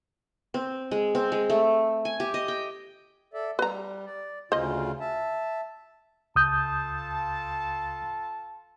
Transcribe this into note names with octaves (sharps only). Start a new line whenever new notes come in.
C4
G#3
C4
G#3
A3
G#5
G4
D#5
G5
A4 D5 E5
G3 B4 A#5
D5
D2 C#3 F4 C5 D#5
E5 A5
C#2 F4 A4 A5 D#6 G6